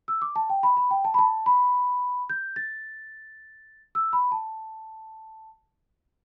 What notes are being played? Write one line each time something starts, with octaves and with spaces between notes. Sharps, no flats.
E6
D6
A5
G5
B5
B5
G5
A5
B5
A5
B5
G6
A6
E6
B5
A5